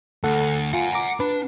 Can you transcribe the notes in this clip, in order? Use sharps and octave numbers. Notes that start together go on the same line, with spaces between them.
D2 A4 F#5
F4 F#5 G#5
A#5 D6
D4 B4